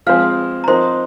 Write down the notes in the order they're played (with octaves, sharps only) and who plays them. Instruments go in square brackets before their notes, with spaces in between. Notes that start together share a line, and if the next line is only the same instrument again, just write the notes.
[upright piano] F3 G#3 C4 G#4 C5 [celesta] F5 F6
[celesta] A#5
[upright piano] F3 C4 D#4 A#4 [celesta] C5 C6